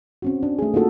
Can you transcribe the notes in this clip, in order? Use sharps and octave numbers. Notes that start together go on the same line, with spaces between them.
C4 C#4 F#4
D4
A3 G#4
A#3 D#4 F4 F#4 A4